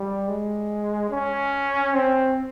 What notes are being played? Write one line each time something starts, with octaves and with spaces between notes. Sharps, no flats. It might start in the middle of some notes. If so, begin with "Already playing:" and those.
Already playing: G3
G#3
C#4
C4